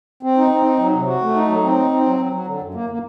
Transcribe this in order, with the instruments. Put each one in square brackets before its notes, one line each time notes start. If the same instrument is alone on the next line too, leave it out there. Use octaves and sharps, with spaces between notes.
[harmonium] C4
D#4
C4
D#4
F#3
C3
F#4
A3
D#4
F#3
C4
D#4
C4
F#3
F#3
F#3
D3
F#2
A#3
A#3